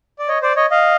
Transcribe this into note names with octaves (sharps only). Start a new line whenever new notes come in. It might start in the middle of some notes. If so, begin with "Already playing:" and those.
D5
C#5 D#5
C5 D5
C#5 D#5
D#5 F5